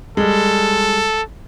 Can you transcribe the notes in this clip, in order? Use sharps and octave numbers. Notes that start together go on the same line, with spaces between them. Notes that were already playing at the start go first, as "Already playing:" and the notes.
G3 G#3 A4